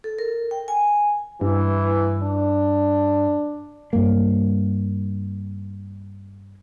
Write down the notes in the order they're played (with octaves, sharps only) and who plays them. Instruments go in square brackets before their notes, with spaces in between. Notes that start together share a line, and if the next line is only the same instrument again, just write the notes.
[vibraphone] A4
A#4
G5
G#5
[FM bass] G2 [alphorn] E3
[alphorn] D4
[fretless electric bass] G2 A#3